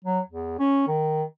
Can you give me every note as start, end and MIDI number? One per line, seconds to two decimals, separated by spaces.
0.05 0.20 54
0.28 0.58 40
0.59 0.87 61
0.88 1.23 51